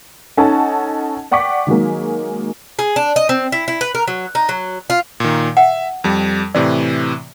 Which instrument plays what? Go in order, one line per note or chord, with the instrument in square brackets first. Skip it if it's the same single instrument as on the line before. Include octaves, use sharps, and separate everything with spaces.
[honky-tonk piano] C#4 D#4 A4 F#5 A5
D5 F#5 G5 C#6 D6 B6
D#3 F#3 G#3 A#3
[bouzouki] G#4
D4
D#5
C4
E4
E4
B4
A#4
F#3
D#4
F#3
F4
[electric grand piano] A#2 D#3
[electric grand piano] E5 [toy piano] F#5
[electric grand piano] F2 G3
[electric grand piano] A2 C3 E3 [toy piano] D5